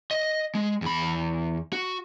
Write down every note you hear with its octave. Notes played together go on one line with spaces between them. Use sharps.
D#5
G#3
E2 B5
F#4